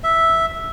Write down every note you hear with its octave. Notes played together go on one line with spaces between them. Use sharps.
E5